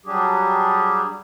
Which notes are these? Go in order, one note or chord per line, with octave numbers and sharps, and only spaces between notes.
F#3 G3 D4 G4 G#4